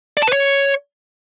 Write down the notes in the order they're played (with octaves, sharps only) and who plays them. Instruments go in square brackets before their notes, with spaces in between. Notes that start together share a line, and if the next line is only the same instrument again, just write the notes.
[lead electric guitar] D5
A5
B4
C#5